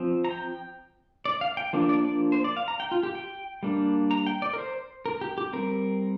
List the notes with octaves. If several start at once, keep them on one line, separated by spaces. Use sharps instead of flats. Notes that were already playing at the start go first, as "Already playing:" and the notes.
Already playing: F3 C4
A#5
G5
D5
F5
G5
F3 A#3 D4
D5
D5
C5
D5
F5
A#5
G5
F4
G4
G5
G3 A#3 D4
A#5
G5
D5
A#4
C5
A#4
G4
G4
G3 C4 A#4